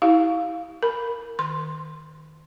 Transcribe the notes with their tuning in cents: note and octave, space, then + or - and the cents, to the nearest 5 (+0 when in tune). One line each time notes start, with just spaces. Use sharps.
E4 -30 G4 -15 F5 +0
A#4 +0 B5 +0
D#3 +0 C6 +10